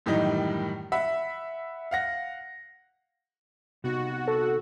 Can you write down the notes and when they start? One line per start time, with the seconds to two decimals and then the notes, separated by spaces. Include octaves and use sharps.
0.06 F#2 A2 D#3 E3 G3 D#4
0.92 E5 F#5 B5
1.91 F5 F#5 A#6
3.84 C3 B3 D#4 F#4
4.27 A4